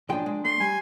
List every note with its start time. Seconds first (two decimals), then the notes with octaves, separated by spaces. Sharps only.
0.09 B1 F3 D4 G#4 G5
0.26 G#3
0.45 A3 C6
0.60 G3 G#5